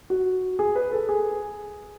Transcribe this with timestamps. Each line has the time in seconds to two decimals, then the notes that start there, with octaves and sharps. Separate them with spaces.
0.10 F#4
0.59 G#4
0.75 B4
0.92 A4
1.09 G#4